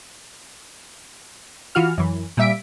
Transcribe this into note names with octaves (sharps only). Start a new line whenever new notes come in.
E3 F4 F#4 F6
F#2 E3
A#2 G3 E5 B6 D7